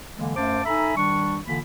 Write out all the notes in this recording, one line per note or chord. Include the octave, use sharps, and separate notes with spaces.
D3 E3 G#3 A#3
F#2 A3 C5 F5 A5 D6
D#4 A4 E5 G#5 A#5 B5
D#3 G3 D4 C#6
D3 E3 A#3 F4 B5